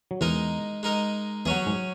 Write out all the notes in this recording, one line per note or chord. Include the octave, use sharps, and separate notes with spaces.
F#3
E2 E3 G#3 D#4 A#4
G#3 D#4 A#4
E2 E3 F#3 C#4 G#4
G#2 G#3